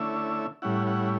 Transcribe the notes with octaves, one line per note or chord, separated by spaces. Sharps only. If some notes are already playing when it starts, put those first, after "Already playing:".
Already playing: D3 A3 C#4 E4 E5
A2 G3 C#4 E4 F#5
F#5